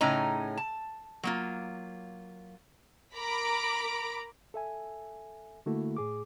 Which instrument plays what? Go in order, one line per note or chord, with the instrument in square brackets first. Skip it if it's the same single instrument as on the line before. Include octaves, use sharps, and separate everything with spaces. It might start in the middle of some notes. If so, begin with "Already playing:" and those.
[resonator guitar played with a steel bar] A2 C#3 C#4 D#4 A#5
A5
F#3 A#3 F4
[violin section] A#4 A#5 B5 D6 D7
[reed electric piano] A4 E5 G#5
D3 A3 A#3 E4 F#4 A4
A2 G#4 D6